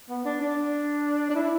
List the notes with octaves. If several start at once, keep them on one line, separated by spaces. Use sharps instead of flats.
B3
D4
D4
D4
E4